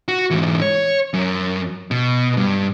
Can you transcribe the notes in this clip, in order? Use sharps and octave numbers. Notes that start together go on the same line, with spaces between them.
F#4
G#2 E3
C#5
F#2
B2
G2